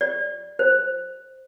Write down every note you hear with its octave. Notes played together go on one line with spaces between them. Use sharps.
D5
C5